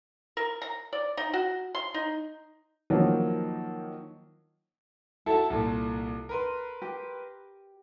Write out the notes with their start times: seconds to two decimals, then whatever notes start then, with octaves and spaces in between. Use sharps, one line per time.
0.37 A#4
0.62 A#5
0.93 D5
1.17 D#4
1.33 F#4
1.75 C6
1.94 D#4
2.90 D#3 F3 F#3 A#3
5.26 E4 F#4 A4 A5
5.50 C2 A#2 A4
6.29 A#4 B4 C6
6.82 G4